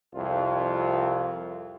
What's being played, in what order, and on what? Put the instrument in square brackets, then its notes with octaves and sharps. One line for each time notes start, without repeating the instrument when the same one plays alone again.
[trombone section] C2 F2 F4